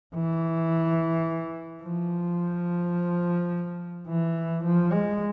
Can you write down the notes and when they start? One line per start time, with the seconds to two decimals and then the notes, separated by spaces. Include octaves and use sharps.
0.15 E3
1.83 F3
4.07 E3
4.64 F3
4.91 G#3